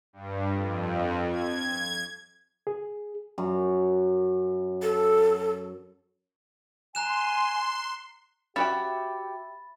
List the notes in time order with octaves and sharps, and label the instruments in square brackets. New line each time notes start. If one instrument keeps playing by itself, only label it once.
[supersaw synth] G2
F2
G#6
[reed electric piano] G#4
[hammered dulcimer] F#2
[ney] A4
[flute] G#5 [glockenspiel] A#5 F#6 E7 [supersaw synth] C6
[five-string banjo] C#4 F#4 G5 [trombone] G4 [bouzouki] E5 [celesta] B5 A6